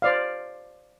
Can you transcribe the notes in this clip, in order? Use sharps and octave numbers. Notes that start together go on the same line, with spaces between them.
C5 D5 F5